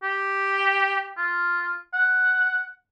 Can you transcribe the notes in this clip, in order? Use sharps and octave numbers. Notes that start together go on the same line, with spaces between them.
G4
F4
F#5